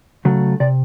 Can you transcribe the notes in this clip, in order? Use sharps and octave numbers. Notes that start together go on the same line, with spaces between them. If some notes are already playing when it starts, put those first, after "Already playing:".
C#3 F#3 A3
C3 D5